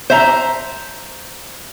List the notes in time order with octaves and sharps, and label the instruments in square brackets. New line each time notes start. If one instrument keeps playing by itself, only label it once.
[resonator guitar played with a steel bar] C5 E5 A#5